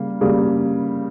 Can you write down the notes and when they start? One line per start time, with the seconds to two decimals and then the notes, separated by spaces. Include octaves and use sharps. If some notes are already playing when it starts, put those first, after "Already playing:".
Already playing: C#3 G3 A#3
0.21 C#3 G3 A#3